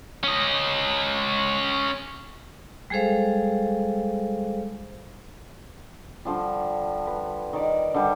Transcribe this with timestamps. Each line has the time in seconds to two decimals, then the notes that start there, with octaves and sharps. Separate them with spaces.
0.23 C#4 D#5
2.90 G3 G#3 G#4 A4 C5 F5
6.25 D3 F3 G3
7.07 B4
7.53 D#3 D5
7.94 D3 G3